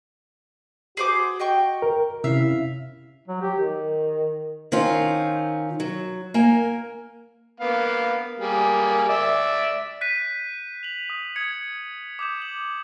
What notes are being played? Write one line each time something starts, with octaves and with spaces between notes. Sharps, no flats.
F#4 G#4 C5 D6
D#5 G5 C#6
A#4
C3 C#4 E4 E5 F5
F#3
G4
D#3
D#3 C4 C#4 F4
F#3
A#3 A#4 G#5
A#3 B3 F5
G3 A#3 G#4
D5 E5
F#6 G6 B6 D#7
F7 F#7
D#6
D#6 G#6 C#7
D6 D#6 G6 E7
F#7